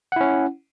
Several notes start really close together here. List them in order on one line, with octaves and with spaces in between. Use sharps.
F#5 E4 C#4